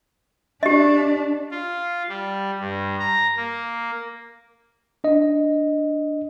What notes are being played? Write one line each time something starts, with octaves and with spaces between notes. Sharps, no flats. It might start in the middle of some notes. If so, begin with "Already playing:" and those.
D4 G4 D#5
F4
G3
G2
A#5
A#3
D4 D#5